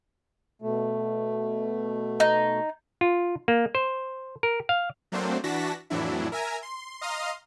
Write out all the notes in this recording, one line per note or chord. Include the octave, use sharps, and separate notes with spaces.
B2 A3
D#4
F4
A#3
C5
A#4
F5
F#3 A3 A#3 C4 D4 C5
E3 D4 F#4 A5 A#6 B6
F2 A2 E3 F#3 D4 E4
A#4 E5 G#5 A#5
C6
D#5 F5 A#5 C6 D#6 F6